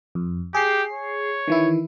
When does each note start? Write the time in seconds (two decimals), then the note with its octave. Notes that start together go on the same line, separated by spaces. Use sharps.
0.15 F2
0.55 G4 G#4 C7
0.92 C#5
1.48 D#3 E3 E4